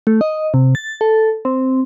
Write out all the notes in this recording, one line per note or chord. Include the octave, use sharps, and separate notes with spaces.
A3
D#5
C3
A6
A4
C4